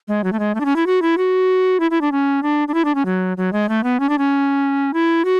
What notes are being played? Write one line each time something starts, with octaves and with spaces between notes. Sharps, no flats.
G#3
F#3
A3
G#3
A3
D4
C#4
E4
F#4
E4
F#4
E4
E4
D4
C#4
D4
D4
E4
D4
C#4
F#3
F#3
G#3
A3
B3
C#4
D4
C#4
E4
F#4